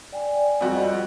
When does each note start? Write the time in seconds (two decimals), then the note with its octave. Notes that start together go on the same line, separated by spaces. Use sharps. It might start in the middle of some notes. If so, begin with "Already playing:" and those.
0.12 D5 G5 G#5
0.61 F2 G3 F#4 D#5